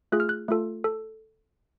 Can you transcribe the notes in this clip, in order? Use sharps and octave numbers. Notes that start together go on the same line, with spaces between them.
A3 F4 G#4 F#6
F6
F#6
A3 F4 A4
A4